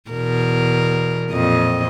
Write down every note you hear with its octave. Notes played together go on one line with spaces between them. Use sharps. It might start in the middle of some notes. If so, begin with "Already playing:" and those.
E2 B2 A#4
F2 A#2 D#5